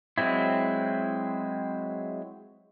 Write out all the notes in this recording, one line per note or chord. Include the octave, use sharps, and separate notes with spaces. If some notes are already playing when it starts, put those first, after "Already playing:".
F#3 G#3 C4 E4